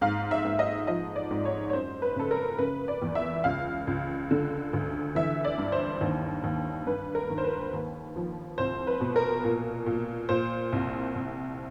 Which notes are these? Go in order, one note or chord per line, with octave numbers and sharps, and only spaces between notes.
G#2 F5
E5
G#2
D#5
F3 D#5
D5
G#2
C#5
C#5
F#2 C5
B4
C#3 A4
A#4
C#3 B4
D5
E2
E5
C#2 F5
C#2
D3
D2
E3 E5
D5
G2
C5
D#2
D#2
G2 B4
A#4
D#3
C5
B4
D#2
F3
C2 C5
B4
B2
A#4
A#2
A#2
A#2 C5
C2
C3